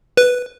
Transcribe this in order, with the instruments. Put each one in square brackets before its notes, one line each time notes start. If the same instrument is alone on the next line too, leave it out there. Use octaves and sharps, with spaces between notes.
[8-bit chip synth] B4